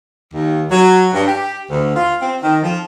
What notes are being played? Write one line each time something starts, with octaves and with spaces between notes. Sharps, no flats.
D#2
F#3
G2
G4
D2
F4
C4
D#3
F3